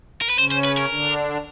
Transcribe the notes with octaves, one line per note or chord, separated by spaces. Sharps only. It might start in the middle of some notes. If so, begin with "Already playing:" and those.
A#4
B4
C#3 C#4 C5
C5
B4
A#4
D3 D4